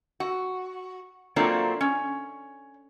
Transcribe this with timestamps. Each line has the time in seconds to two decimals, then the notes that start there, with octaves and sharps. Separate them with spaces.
0.20 F#4
1.36 F#3 A3 A#3 C4 D4 F4
1.81 C#4